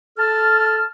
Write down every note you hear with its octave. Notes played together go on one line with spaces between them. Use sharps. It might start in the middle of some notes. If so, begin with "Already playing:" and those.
A4 A5 F6